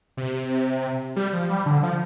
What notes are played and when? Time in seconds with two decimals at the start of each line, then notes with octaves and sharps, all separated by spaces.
0.17 C3
1.16 G3
1.33 F3
1.50 G3
1.66 D3
1.83 F3